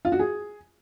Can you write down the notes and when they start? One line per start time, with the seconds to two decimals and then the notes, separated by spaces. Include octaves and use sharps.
0.05 F4
0.12 F#4
0.19 G#4